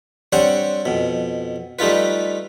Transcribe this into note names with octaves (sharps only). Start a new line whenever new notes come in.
G3 C4 D4 C5 C#5 F#5
F2 B2
G3 A3 D#4 F4 B4